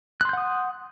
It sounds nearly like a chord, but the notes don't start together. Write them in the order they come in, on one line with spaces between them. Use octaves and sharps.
F#6 C6 G6 F#5 D#6